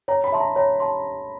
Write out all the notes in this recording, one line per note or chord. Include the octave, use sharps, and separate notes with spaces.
C#5 A#5
B5
E5 A5 C6
A#5
C#5 A#5
A5 C6